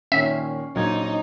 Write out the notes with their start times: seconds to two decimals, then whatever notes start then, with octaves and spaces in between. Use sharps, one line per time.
0.12 A#2 D#3 C#4 E5 C7
0.76 A#1 F#3 D#4 G#6